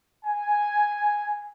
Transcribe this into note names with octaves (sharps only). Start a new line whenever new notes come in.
G#5